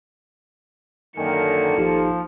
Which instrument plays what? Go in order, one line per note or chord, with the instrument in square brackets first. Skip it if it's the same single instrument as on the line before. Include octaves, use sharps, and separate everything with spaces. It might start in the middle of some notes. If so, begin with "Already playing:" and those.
[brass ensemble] F#2 D3 D#3 [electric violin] A#3 C#7 [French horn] A4 [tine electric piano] G5 G#5
[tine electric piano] G#1 D#4 G4 [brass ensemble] F3